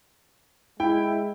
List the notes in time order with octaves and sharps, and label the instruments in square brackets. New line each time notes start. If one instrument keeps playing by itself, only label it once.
[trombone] G#3 [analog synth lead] E4 [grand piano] G5